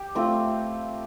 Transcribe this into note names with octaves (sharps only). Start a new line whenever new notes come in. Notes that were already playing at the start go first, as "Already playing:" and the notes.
Already playing: G4
A3 C4 F4